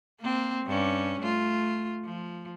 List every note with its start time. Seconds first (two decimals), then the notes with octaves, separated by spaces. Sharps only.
0.20 A#3 C4
0.65 G2 C#4
1.21 A3 F4
2.04 F3